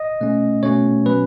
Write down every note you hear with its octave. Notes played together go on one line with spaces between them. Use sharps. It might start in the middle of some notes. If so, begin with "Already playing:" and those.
Already playing: D#5
B2 A3 C#4
B2 A3 C#4 C#5
B2 F#3 C#4 B4